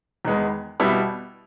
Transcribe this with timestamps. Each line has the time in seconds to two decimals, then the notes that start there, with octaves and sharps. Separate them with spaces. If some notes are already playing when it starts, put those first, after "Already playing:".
0.25 E2 D#3 G#3 B3
0.80 B2 G3 B3 E4